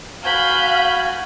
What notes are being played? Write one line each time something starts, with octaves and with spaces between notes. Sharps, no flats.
F#4 F5 G#5 B5 G6